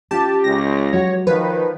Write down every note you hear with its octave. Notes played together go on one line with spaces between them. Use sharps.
C#4 F4 G4 A5
C#2 A#6
F#3 F#4 G4 C#5
D#3 F3 B4 C#5 F5